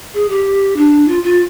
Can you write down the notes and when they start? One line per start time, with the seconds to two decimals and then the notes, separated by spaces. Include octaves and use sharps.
0.14 G#4
0.29 G4
0.77 D4
1.08 F4
1.23 F4